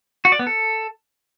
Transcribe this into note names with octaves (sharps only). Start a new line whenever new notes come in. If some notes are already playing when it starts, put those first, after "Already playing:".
F#4
D5
B3
A4